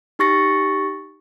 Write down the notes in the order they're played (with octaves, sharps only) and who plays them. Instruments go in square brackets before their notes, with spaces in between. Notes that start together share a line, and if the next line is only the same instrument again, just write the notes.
[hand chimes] D#4 G4 C#6 A6 A#6 C#7